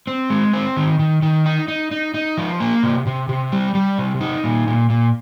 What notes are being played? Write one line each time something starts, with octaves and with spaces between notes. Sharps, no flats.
C4
G#3
C4
D#3
D#3
D#3
D#4
D#4
D#4
D#4
F3
A#3
C3
C3
C3
G3
G3
C3
D#4
A#2
A#2
A#2